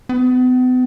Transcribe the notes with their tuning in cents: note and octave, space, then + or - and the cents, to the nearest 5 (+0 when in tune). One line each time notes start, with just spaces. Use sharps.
B3 +40